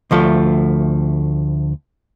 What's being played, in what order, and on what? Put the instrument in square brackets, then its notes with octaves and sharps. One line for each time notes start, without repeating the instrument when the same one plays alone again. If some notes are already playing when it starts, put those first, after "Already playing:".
[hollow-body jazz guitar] D2 F3 A3